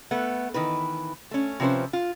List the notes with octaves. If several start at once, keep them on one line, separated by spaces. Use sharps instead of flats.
A3 B3
D#3 E3 B4
A3 C#4
C3 F3 C#4 B4 C5
F4